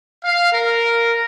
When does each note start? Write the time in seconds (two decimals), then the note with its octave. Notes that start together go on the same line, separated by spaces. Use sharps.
0.22 F5
0.51 A#4